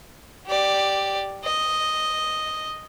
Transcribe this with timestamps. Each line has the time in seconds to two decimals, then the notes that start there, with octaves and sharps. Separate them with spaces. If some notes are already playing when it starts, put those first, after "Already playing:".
0.46 G4 D5
1.44 D#5